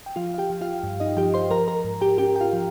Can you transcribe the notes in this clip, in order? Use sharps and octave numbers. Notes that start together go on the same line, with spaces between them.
G5
F3 F4 F5
F5
G4 G5
F3
F4 F5
G2
D#4 D#5
F3 G4 G5
C5 C6
F3 A#4 A#5
A#4 A#5
G#2
G4 G5
C#4 G4 G5
G5
F4 F5
F3